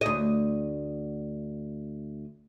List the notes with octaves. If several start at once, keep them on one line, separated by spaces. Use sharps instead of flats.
D2 D#5